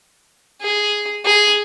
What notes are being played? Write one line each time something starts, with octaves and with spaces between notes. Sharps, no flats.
G#4
G#4